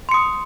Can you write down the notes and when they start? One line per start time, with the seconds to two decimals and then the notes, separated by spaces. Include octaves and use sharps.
0.09 C6
0.11 C#7
0.14 D#6